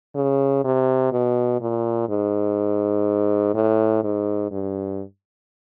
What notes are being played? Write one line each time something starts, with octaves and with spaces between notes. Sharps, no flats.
C#3
C3
B2
A#2
G#2
A2
G#2
G2